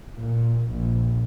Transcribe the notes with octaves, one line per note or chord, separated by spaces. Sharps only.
A#2
A#1